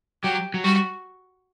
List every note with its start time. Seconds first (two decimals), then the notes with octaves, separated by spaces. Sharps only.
0.23 F#3 G4
0.54 F#3
0.64 G3 F#4